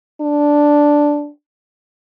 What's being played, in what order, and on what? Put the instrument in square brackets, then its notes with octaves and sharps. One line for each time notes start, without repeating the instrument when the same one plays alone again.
[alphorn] D4